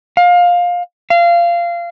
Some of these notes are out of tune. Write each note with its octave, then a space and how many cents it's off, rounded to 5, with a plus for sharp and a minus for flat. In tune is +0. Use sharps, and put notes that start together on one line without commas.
F5 +20
F5 -20